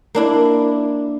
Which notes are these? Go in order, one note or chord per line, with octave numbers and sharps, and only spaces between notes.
A#3 D4 E4